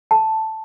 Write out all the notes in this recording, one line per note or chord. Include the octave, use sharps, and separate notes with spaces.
A5